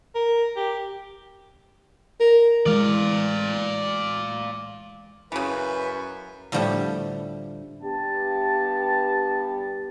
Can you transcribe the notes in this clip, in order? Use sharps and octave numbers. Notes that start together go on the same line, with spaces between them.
A#4
G4
A#4
E3 G#3 D5 F5
F#2 C#3 E3 B4
A2 D3 F3 G3 A3 G4
G2 B3 G4 A5